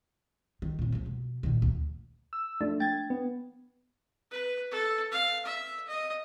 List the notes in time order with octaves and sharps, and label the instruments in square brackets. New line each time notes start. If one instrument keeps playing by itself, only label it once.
[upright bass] D#3
F2 A#2
F3 G#3
B2
A#2 D#3
D2
[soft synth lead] E6
[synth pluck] F3 D4 [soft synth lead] A3
[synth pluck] G5 G#6 [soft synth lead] A6
[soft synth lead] B3
[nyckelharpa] B4
A4
F5
E5
D#5